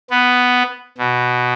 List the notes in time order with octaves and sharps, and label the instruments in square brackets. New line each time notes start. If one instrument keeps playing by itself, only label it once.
[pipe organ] B3
B2